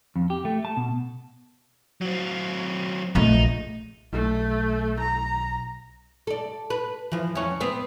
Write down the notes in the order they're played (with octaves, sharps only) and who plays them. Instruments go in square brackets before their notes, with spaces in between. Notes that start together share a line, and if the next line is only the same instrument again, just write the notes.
[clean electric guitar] F2
G4
A3
A5
B2
[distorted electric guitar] F#3 C4
[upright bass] A#1 A3 [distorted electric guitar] D#4
[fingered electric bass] B1 [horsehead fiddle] A3
[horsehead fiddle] A#5
[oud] A4 D5
B4
E3 F3
F2 C#4
B3 C4 C5